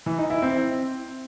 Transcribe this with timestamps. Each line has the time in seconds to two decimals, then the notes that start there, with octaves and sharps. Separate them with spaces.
0.06 E3
0.18 D#4
0.30 E4
0.42 C4